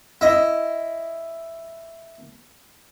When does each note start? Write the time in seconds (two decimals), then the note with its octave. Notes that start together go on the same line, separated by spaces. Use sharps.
0.21 E4 D#5